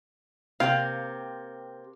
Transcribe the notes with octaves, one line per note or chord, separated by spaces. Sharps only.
C3 A#3 C4 F5